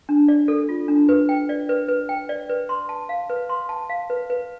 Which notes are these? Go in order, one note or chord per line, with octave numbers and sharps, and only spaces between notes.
D4
D5
A4
F4
D4
B4
G5
D5
B4
B4
G5
D5
B4
C6
A5
F5
B4
C6
A5
F5
B4
B4